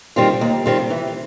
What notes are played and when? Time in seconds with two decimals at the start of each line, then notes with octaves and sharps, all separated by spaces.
0.16 D#3 G3 C4 F4
0.41 D#2
0.66 D#3 G3 C4 F4
0.90 E3